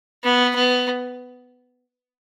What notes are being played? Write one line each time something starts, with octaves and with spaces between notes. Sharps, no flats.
B3
B3